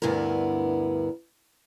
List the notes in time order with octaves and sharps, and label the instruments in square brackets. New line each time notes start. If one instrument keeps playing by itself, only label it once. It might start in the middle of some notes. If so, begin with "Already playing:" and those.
[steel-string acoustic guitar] D2 G2 B3 E4 A#4